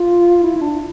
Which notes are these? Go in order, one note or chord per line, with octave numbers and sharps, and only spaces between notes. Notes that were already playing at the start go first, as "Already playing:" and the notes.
Already playing: F4
E4
E4
D4